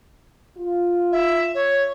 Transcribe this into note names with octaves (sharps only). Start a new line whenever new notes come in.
F4
E5
C#5